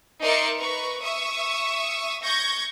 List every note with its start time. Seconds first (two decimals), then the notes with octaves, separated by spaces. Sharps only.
0.22 D#4 A#4 D5 E5 C6 C#7
0.59 B4 A#5 C#6
1.02 E5 C#6 D#6
2.23 C#6 G6 G#6 A#6